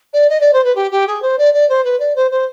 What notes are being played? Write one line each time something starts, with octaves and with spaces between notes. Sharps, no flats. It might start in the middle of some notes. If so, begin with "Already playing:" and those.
D5
D#5
D5
C5
B4
G4
G4
G#4
C5
D5
D5
C5
B4
D5
C5
C5